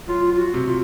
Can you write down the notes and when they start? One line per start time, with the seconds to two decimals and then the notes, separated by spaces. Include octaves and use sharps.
0.08 F#3 F4
0.32 F4
0.38 F#4
0.54 C3
0.68 F4